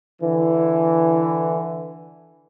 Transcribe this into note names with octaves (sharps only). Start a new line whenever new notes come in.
D3 E3